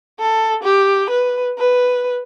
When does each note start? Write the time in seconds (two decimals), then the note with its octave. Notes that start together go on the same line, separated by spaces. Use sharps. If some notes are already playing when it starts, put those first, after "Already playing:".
0.20 A4
0.63 G4
1.10 B4
1.59 B4